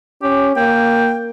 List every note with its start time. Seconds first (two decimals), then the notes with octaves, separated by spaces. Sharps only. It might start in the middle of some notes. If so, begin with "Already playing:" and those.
0.23 C#4 G4
0.57 A#3 G5